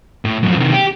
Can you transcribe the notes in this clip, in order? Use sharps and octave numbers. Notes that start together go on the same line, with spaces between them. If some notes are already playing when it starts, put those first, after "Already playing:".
A2
F#2 F3
C3 D#3
G4